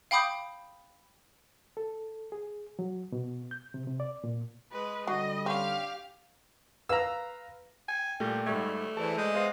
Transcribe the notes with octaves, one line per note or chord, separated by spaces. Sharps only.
F5 G5 B5 D6 D#6 G6
A4
G#4
F#3
B2
G6
C3
C3
D5
A#2
G#3 B4
D3 F#3 G3 D#5
C4 C#4 G4 F5
B4 F5 A#5 E6
G5 G#5
A#2 G3 A3 D5 G5 A#6
G#2 G3 A3 C#6 G#6
E3 G#4 C5 D5 A5
G#3 G6
B3 G#4 C5 E5 F5 C6 A#6